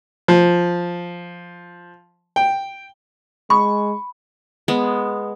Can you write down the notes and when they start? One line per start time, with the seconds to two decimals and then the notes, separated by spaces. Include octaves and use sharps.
0.28 F3
2.36 G5
3.50 G#3 B5 C#6
4.68 G#3 B3